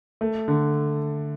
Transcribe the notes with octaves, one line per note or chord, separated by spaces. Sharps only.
A3
D3